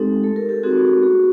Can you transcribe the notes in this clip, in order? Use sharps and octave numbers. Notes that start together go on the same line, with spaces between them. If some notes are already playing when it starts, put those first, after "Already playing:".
Already playing: G#3 C4 D#4 G4 A4
A3 A4
A#4
G4 A4
C4 D#4 F#4 G#4
B3 F#4 G#4